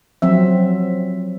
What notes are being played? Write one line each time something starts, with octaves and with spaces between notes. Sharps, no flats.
F3 F#3 C4 E5